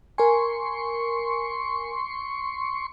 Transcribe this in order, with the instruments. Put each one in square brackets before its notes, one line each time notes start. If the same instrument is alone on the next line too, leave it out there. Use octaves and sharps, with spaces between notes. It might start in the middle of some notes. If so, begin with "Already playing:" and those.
[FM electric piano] A#4 G#5 [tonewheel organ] C6 C#6